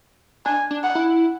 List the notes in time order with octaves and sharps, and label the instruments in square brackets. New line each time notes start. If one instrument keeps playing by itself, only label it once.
[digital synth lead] D4 [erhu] G#5
[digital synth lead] D4
[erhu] F#5
[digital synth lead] E4